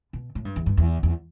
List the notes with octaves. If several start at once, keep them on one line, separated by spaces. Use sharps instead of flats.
B2
A2
G2
E2
G2
E2
E2